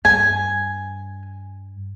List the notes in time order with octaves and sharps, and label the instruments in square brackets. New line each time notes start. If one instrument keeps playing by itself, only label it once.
[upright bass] G2 [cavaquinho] G#5